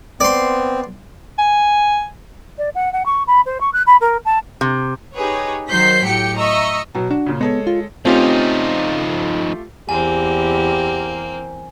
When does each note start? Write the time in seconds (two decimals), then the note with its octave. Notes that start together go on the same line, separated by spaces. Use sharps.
0.20 B3 C4 D5 C6
1.38 G#5
2.58 D5
2.75 F#5
2.93 F#5
3.06 C#6
3.27 B5
3.46 C5
3.61 C#6
3.73 F#6
3.87 B5
4.01 A#4
4.25 A5
4.61 C3
5.15 D#4 G4 G#4 B4 C#5
5.69 D#3 F#3 C5 G6 B6 C7
6.05 A2 G4 G5 C#7
6.38 D#5 E5 A#5 C#6 E6
6.95 B2 F#3
7.11 D4 F#4
7.26 A#2 C#3
7.41 G#3 B3 A4 C#5
7.67 F4
8.05 F3 A3 C4 C#4 D#4 F4 G4
9.89 E2 A#3 C4 G4 G#5